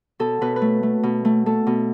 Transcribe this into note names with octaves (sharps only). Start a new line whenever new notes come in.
B2 A4
B2 B4
B4
A3
A3
B2
A3
A3 A4
B2